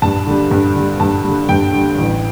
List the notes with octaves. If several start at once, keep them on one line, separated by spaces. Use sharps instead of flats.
G2 A5
D3 G3
G2
D3 G3
G2 A5
D3 G3
G2 G5
D3 G3
A1